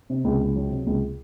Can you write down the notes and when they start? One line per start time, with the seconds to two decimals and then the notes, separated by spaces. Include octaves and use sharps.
0.10 C3
0.24 C#2
0.40 C#2
0.55 F#3
0.70 C3
0.87 C#2